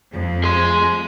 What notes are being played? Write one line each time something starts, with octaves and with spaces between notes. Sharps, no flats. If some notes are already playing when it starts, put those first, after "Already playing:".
F2
G#4 C6